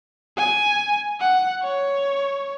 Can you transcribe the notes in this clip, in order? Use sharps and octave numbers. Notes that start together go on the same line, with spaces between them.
G#5
F#5
C#5